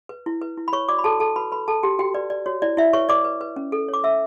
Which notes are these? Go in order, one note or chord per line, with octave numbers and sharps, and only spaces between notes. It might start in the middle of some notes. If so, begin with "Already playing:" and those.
B4
E4
B4
E4
B5
B4 C#5 C#6
F#4 D5 D6
B5
F#4 A4 A5
F#4 A4 A5
F#4 B4 B5
F#4 B4 B5
A4 B4 A5
F#4 G4 G5
F#4 G4 G5
B4 D5
B4 D5
F#4 C#5
E4 D5
E4 E5
B4 C#5 C#6
B4 D5 D6
B4
B4
C#4
A4
C#5
D6
C#4 E5 E6